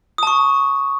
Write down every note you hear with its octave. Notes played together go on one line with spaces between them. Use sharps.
A5 C#6 D#6